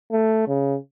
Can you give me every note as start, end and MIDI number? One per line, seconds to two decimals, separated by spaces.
0.12 0.47 57
0.47 0.76 49